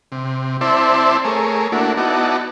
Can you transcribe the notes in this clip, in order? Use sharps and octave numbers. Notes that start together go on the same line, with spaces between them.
C3
C4 E4 C5 D5 E5 A5
A3 G#4 A#4 C#5
A3 A#3 D4 E4 F#4
B3 D#4 E4 F#4 D5 A5